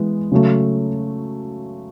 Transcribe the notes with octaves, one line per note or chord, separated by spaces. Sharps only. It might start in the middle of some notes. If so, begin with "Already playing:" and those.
Already playing: E3 G#3 B3
C#3 F#3 A3